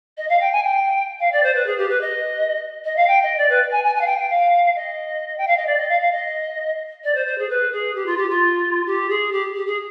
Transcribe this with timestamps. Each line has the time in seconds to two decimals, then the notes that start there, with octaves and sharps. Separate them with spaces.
0.17 D#5
0.29 F5
0.40 G5
0.52 G#5
0.63 G5
1.20 F5
1.32 D5
1.43 C5
1.54 B4
1.66 G#4
1.78 G4
1.89 B4
2.01 D#5
2.84 D#5
2.96 F5
3.07 G5
3.22 D#5
3.38 D5
3.49 B4
3.71 G#5
3.84 G#5
3.95 G#5
4.01 F5
4.06 G5
4.18 G5
4.29 F5
4.75 D#5
5.38 G5
5.47 F5
5.56 D#5
5.66 D5
5.78 D#5
5.89 F5
6.01 F5
6.12 D#5
7.04 D5
7.15 C5
7.26 C5
7.38 G#4
7.49 B4
7.72 G#4
7.95 G4
8.06 F4
8.17 G4
8.29 F4
8.86 G4
9.09 G#4
9.32 G4
9.55 G4
9.66 G#4